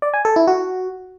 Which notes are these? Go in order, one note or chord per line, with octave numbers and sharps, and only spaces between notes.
D5
G#5
A4
E4
F#4